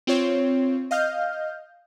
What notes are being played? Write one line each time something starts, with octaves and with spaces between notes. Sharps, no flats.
C4 F4 C#5
D#5 F5 F6 G6